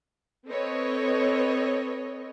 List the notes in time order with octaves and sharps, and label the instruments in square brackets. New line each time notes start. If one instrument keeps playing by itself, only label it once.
[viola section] C4 A4 B4 C#5 D#5